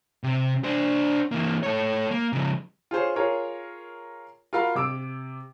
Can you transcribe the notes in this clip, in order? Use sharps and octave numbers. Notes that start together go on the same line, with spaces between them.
C3
D4 C5
E3 A#3
A3 C#5
A#3
C#3 F3
F4 G#4 C5 C#5
F4 G#4 A#4 C#5
F4 F#4 A#4 F5 B5
C3 D6 E6 D7